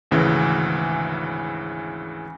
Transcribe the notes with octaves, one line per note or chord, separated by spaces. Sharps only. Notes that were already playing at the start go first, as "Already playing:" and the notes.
G#1 D2 C#3 E3